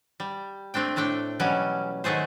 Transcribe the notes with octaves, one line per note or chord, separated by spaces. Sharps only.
G3
A3 C4 D4 G5
A2 A3 D4 G5
B2 E3 F#3 G3 C#4
D#3 F#3 A3 G#4 C5